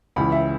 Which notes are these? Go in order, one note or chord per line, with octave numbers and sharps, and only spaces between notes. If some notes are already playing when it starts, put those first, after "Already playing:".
C#2 C#3 E3 B5
E5